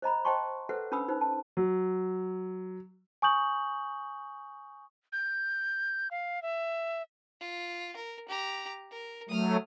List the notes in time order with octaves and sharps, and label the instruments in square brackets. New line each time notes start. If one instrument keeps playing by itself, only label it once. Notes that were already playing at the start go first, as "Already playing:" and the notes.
[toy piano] C5 D#5 A#5 B5
C5 D#5 G5 A5 C6 C#6
A4 B4 C5 E5 F#5
C#4 D4 B4 B5 D#6 E6
D#4 B4 C5
A5
[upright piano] F#3
[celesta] G#5 C#6 D#6 G6 F#7
[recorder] G6
F5
E5
[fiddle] F4
A#4
G4 A#5
A#4
[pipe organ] F#3 A3 [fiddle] D#6 F6